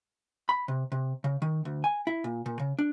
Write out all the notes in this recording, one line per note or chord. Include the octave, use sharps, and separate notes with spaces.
B5
C3
C3
C#3
D#3
D2
G#5
E4
A#2
A#2
C#3
D4